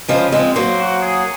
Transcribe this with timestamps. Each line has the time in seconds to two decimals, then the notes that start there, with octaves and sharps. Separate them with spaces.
0.08 C#3 F3 G#3
0.32 F3 G#3 C4
0.56 F#3 A#3 C5
0.80 F#4
1.02 G#4